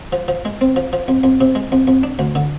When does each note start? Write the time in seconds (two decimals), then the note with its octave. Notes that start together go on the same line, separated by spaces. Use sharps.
0.13 F3
0.28 F3
0.45 G#3
0.61 C4
0.76 F3
0.93 F3
1.08 F2
1.23 F2
1.41 C3
1.55 G#3
1.72 F2
1.87 F2
2.03 D4
2.19 D2
2.35 D3